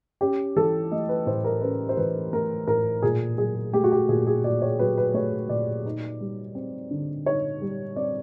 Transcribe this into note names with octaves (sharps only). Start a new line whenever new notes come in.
C#4 G4
E3 A4
A3 D#5
B4
A2 C5
A#4
C#4 B4
C5
E3 B4
A3 A#4
A2 A#4
A#2 G#4
F#3 G#4
A3 G4
F#4
G4
A#2 G#4
G#4
A#2 D5
C#5
F#3 B4
B4
A3 C#5
A#2 D5
D#4
G3
C4
D3
D#4 C#5
G3
C4 D5